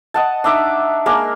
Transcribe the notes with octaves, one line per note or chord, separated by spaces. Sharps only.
D#5 F#5 A5
D4 D#4 E5 D6
G#3 A#3 D4 A#4